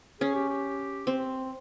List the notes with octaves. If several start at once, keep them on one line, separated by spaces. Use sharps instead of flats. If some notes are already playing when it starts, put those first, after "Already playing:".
C#4 G#4
G4
G4
C4